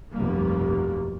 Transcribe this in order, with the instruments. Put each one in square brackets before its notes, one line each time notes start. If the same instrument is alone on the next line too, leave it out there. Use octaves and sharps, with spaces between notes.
[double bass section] F1 B1 G2 G3 A#3